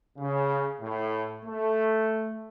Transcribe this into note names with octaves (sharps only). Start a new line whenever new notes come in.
C#3
A2
A3